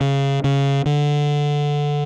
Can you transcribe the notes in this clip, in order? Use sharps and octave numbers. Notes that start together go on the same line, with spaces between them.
C#3
C#3
D3